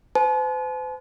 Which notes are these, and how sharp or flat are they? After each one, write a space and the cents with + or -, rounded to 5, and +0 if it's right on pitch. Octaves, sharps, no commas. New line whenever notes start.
C5 -45 A5 -45